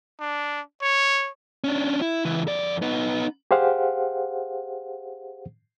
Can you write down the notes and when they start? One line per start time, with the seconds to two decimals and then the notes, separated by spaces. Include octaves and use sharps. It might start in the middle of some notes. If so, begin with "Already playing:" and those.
0.20 D4
0.82 C#5
1.64 C#4 D4
2.02 E4
2.25 C#2 E3
2.48 F2 D5
2.82 B3 D#4
3.51 G4 G#4 C5 F5 F#5